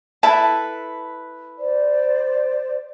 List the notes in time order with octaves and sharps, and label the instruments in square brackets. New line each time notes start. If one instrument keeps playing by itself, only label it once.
[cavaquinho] E4 A4 B4 [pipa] A5
[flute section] C5 D5